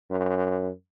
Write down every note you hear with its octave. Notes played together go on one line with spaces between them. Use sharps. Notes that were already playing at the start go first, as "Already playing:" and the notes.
F#2